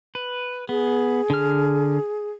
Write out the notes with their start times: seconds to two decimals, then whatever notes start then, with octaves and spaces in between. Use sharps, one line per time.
0.15 B4
0.69 B3 G#4
1.30 D3 F6